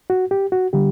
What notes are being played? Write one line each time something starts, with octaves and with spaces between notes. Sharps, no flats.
F#4
G4
F#4
D3 G3 G4